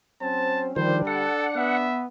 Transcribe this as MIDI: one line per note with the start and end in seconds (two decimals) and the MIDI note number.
0.22 0.75 54
0.22 0.75 60
0.22 0.75 61
0.22 0.69 72
0.22 0.64 81
0.76 1.26 50
0.76 1.02 51
0.76 1.02 53
0.76 1.26 55
0.76 1.89 62
0.76 1.00 72
1.07 1.47 69
1.07 1.77 78
1.56 2.05 59
1.56 2.05 76